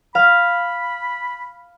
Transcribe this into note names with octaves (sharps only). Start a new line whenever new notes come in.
F5 B5